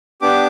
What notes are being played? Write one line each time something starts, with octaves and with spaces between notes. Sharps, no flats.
B3 D4 G4 D6